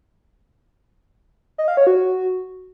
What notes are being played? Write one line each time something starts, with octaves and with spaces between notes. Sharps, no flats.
D#5
F5
C#5
F#4